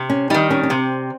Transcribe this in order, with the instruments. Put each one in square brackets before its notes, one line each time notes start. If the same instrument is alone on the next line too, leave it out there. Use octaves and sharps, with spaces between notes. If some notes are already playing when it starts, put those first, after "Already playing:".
Already playing: [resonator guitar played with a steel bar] C3
[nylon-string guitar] C#4
[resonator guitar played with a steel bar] D#3 G3 [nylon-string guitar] D#4
[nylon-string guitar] C#4
C#4
[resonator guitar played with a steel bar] C3 [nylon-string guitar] C4